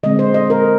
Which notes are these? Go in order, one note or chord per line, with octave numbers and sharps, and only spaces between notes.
D3 G#3 C4 D#5
C5
D#5
A#4